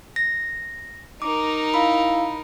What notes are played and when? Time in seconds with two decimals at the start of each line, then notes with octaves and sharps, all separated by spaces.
0.16 A#6
1.22 D#4 A#4 D6
1.74 E4 F5 B5